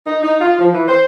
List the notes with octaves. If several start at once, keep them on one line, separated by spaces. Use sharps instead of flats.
D#4
D#4
F4
F3
E3
C5